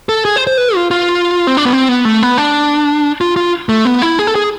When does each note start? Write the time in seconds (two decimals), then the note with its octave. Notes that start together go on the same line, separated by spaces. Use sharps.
0.09 A4
0.25 G#4
0.36 C5
0.47 C5
0.58 B4
0.75 F4
0.91 F4
1.47 C4
1.57 D4
1.65 B3
1.73 C4
1.89 B3
2.05 A3
2.23 B3
2.38 D4
3.21 F4
3.36 F4
3.69 A3
3.85 B3
4.02 E4
4.19 G#4
4.27 A4
4.35 G#4